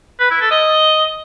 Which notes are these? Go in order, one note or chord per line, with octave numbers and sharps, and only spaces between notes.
B4
E4
A4
D#5